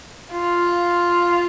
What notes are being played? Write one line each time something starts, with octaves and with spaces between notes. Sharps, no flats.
F4